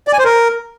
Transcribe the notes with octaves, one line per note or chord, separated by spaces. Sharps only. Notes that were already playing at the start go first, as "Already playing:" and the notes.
D5
G#5
C5
A#4